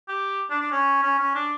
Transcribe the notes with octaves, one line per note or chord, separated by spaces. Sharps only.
G4
D4
D4
C#4
C#4
C#4
D4